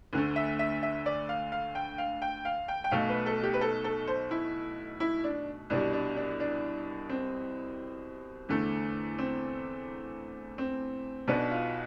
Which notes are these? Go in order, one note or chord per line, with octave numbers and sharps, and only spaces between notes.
D2 D3 A3
E5
E5
E5
D5
F5
F5
G5
F5
G5
F5
G5
G5
B1 B2 A3 F5
B4
A4
G4
B4
A4
A4
C5
E4
E4
D4
C2 B2 G3 D4
D4
D4
D4
C4
E2 D3 A3
C4
C4
B1 B2 B3 D4
F4